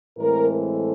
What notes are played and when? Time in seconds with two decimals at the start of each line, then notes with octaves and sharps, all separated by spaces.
0.17 A2 E3 G#3 C4 A#4
0.60 A4